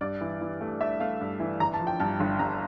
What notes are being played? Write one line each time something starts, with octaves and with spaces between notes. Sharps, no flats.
G2 D5
E3
E3
A3
A3 E5
A3 F5
G2
E3
G1 A#5
A5
F3
G5
G2 A5
G1
G2 A#5